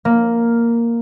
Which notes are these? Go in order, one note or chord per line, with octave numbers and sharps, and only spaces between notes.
A#3